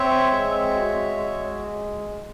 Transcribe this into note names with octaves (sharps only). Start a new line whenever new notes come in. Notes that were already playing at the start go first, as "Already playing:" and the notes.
Already playing: C4 C#5 E5
G#3
F#4
G#3